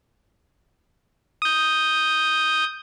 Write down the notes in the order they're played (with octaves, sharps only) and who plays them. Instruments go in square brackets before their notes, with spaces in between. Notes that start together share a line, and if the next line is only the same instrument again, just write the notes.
[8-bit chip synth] D#6 G6